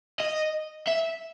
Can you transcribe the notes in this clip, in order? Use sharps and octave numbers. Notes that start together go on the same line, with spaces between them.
D#5
E5